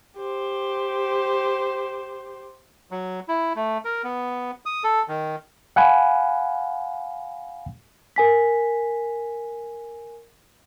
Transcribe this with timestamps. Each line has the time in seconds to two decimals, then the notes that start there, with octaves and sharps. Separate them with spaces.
0.17 G4 C5
2.91 F#3
3.28 E4
3.56 A3
3.85 A#4
4.04 B3
4.66 D#6
4.84 A4
5.08 D#3
5.76 F5 F#5 G#5 B5
8.16 A#4 G#5 B6